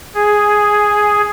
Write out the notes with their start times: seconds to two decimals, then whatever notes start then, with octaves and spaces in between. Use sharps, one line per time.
0.15 G#4